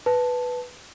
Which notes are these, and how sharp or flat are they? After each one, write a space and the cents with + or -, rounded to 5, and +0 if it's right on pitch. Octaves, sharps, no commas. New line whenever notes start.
B4 +0 A5 +0